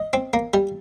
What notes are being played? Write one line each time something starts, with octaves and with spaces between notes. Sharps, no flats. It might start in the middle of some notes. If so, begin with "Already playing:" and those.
Already playing: D#5
C4
A#3
G3